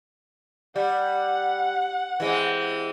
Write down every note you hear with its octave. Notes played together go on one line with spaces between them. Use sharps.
G3 F#5
E3 G#3 C4